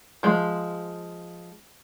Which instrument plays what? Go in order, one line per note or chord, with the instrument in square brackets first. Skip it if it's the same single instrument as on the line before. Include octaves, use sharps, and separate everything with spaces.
[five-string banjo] F3 G#3